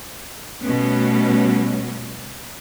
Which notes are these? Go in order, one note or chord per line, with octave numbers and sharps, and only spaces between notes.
B2 G3 A3 B3 C#4